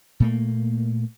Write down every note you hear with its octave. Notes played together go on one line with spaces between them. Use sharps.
A#2 A3 A#3